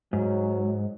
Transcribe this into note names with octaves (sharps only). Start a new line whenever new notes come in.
G#2 F#3